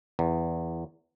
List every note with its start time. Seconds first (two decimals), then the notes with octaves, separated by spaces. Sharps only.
0.19 E2